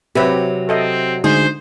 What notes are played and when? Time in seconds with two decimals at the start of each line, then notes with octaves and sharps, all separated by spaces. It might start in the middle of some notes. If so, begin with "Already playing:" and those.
0.15 C3 F#3 G4 B4 E5
0.69 C4 A4 D#5 E5
1.24 D2 D3 G#3 D#4 G#4 C5 D#6